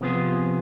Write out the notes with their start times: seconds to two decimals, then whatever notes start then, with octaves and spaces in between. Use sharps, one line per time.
0.01 C3 F3 B3 F4 G#4